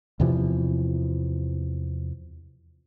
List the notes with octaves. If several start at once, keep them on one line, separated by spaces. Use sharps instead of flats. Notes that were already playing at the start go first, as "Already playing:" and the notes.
E2 C3 E3 F3